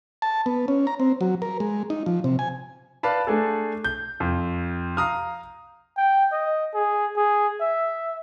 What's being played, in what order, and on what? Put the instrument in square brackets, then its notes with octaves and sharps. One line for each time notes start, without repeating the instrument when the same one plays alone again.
[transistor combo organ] A5
B3
C#4
A#5
C4
F#3
A#4
G#3
D#4
F3
C3
G#5
[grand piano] B4 D5 F5 A5 B5
A3 D4 G#4 A4
G6
F2
F5 A#5 D#6 F6
[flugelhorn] G5
D#5
G#4
G#4
E5